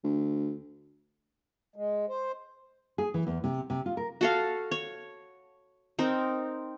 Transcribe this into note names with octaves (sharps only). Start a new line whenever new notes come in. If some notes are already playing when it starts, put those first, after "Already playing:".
D2
G#3
C5
G#4
E3
E2
C3
C3
F4
A#4
F#4 A4 F5
C#5
C4 D#4 A#4